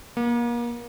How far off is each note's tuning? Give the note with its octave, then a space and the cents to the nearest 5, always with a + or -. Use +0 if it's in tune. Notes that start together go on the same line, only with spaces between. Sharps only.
A#3 +35